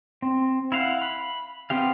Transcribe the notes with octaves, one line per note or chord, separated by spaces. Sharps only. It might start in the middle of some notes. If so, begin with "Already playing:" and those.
C4
E4 F5 F#5
B5
B3 C4 G4 F5